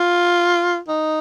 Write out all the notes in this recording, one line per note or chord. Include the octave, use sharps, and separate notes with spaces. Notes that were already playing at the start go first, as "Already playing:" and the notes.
Already playing: F4
D#4